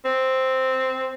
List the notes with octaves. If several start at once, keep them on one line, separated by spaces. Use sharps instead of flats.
C4